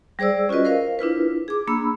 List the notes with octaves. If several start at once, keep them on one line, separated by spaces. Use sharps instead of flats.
G3 G#4 C5 D5 E6
C#4 F4 F#4 B4 D#5
A#4 C5 F5
D4 E4 F4 B4
G#4 D6
A#3 D4 B5 E6